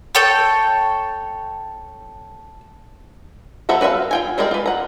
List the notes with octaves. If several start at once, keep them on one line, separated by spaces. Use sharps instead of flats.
A4 C#5 G5
F3 B3 A4 E5 A#5
F#4 B4 D5 E5 F5
F4 G5 G#5
G3 G#3 A#4 D5 G5
F4 B4
F#5 A#5